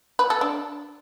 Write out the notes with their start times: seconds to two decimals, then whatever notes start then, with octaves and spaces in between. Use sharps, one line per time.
0.19 B4
0.30 A4
0.41 D4